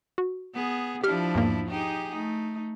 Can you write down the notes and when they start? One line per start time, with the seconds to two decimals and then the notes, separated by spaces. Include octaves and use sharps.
0.18 F#4
0.54 B3 G#4
1.04 F3 D4 E4 G4 F6
1.35 E2 G#2 A#3
1.68 D#4 G4 G#4
2.12 A3 D#4